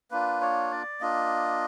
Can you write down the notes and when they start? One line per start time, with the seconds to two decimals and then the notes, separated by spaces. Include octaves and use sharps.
0.11 A#3 D4 F4 B4
0.41 C#5
0.71 D5
1.01 A#3 D4 F4 D#5